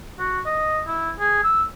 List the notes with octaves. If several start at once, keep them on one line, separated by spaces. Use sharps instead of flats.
F#4
D#5
E4
G#4
E6